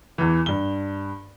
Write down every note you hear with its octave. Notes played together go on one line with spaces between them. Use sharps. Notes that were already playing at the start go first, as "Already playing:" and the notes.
E2 E3
G2 G7